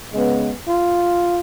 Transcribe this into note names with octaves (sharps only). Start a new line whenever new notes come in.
C#3 G#3 B3
F4